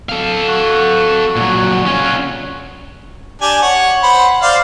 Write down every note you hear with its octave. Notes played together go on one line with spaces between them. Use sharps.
A4 F5
F#4 F#5
A#2 F#3
C#4 F4
D4 G4 G#5
C#5 F#5
C5 F#5 B5
C5 D5 F5